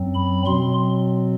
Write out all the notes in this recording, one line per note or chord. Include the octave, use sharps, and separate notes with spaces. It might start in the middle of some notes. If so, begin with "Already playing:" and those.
Already playing: F#2 F#3 C4
B5
B2 F#3 C4 C6